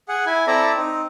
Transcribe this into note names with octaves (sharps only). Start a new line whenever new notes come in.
G#4 F#5
E4 G#5
C4 E4 A4 D5 A#5
C4 D#4